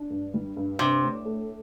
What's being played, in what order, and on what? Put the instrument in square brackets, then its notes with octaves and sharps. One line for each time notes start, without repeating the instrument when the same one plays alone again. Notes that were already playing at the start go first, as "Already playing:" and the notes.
Already playing: [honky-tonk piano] D4
G2
G3
G2
[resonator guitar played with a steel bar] C3 [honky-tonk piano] D4
[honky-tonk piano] A2
A3